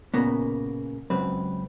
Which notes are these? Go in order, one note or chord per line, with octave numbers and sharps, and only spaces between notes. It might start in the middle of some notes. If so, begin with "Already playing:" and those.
A#2 C#3 A#3 B3
C#2 F#2 C4 B4